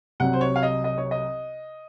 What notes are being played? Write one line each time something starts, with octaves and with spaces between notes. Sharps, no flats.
C2 C3 F#3 F#5
C5
C#5
F5
D#5
D#5
C#5
D#5